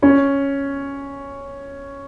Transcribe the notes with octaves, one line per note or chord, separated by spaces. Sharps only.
C#4